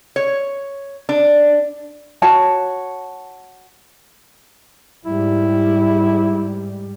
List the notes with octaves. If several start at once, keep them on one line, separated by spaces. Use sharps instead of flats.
C#5
D4
F#4 C#5 A5
G#2 G3 E4